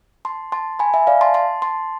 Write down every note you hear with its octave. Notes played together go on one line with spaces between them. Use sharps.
A5 C6
A5 C6
G#5 B5
E5 G#5
D5 F5
A5 C6
A5 C6
A5 C6